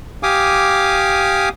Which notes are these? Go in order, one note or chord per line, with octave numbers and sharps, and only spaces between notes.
G4 F5 G#5 D6 D#6